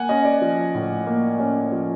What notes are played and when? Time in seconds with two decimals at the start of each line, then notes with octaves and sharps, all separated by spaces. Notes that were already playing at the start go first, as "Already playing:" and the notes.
Already playing: A#3 F#5 G#5
0.09 C#4 D#5
0.25 D5
0.42 F3
0.75 A2
1.07 A#3
1.39 C#4
1.72 F3